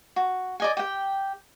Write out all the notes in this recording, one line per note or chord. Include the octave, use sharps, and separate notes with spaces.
F#4
D5 D#5 G#5
G4 G5